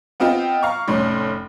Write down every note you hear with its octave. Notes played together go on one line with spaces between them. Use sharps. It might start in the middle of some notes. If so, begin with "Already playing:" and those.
B3 C4 F4 D#5 G5
F5 A#5 C#6
F1 A2 C#4 C6